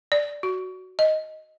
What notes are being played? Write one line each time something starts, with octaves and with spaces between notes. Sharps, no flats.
D5
F#4
D#5